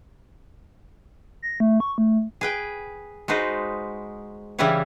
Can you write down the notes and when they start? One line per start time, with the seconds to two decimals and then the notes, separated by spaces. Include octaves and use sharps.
1.42 A#6
1.60 A3
1.80 C#6
1.98 A3
2.41 G#4 B4 G5
3.28 G#3 D#4 F#4 B4 C5
4.59 C#3 E3 G3 E4 B4 C#5